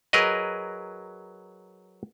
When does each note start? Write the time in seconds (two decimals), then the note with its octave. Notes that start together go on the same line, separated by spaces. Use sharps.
0.13 F#3 G#4 A#4 B4 D#5